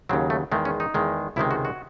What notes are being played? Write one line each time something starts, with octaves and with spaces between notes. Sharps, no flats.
D#2 C#3 F#3 C4
A3
E2 D#3 G#3 A3
C#4
D#4
E2 D#3 G#3
C#2 C3 D#3 G#3 E4
F#4
F#4